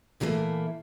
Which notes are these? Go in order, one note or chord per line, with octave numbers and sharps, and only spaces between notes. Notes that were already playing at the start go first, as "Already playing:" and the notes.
A#2 D3 E3 G3 A3 A#3